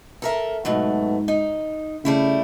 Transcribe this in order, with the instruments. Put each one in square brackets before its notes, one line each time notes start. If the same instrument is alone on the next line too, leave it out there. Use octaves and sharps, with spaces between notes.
[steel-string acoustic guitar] A4 A#4 E5
[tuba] G#2 [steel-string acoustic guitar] B2 F#3 A3
[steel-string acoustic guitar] D#4
[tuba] C#3 [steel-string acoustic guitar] G3 A3 E4